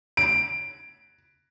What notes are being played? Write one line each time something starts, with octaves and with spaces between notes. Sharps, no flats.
D7